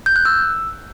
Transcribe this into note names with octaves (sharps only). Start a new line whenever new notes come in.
G6
F#6
E6